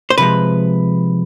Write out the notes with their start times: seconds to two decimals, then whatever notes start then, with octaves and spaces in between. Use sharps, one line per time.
0.10 C5
0.18 C3 F3 G#3 B4